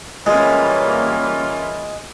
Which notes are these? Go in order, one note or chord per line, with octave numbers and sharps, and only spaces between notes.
E3 G3 G#3 A#3 C#4 F4